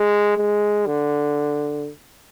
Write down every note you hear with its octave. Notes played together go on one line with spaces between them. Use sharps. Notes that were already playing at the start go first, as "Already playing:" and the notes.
Already playing: G#3
G#3
D3